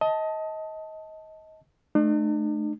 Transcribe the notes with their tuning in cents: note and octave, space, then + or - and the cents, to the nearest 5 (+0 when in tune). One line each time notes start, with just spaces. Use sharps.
D#5 +25 A5 +0
A3 -30 D4 +45